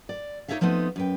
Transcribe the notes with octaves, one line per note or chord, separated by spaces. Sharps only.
D5
D#4 G#4 C#5 D5 E5 F5
F3 A3 B3 C4 D#4
F#2 B4 G5